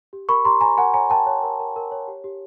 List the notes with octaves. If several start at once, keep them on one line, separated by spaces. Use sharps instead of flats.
G4
A#4 B5 C#6
G4 A#5 C6
C#5 G#5 A#5
A#4 F#5 G#5
C#5 G#5 A#5
A#4 G5 A5
C#5
A#4
A#4
A#4
C#5
G4
G4